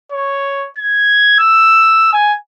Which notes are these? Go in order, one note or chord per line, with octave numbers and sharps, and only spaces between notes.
C#5
G#6
E6
G#5